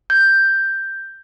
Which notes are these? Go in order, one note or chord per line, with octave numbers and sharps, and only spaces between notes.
G6